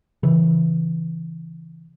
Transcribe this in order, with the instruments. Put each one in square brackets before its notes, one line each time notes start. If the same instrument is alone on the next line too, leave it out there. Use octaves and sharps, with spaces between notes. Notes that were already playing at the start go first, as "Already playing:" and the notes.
[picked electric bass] C#3 E3